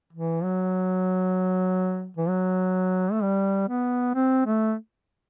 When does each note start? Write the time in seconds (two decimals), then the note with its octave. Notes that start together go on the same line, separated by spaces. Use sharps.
0.12 E3
0.43 F#3
2.17 E3
2.29 F#3
3.12 A3
3.22 G3
3.68 B3
4.15 C4
4.46 A3